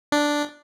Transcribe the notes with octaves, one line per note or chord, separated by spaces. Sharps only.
D4